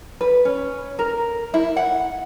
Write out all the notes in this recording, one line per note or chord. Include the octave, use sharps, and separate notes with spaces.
B4
C#4
A#4
E4
F#5